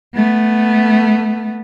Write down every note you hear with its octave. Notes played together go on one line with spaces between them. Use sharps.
A3 B3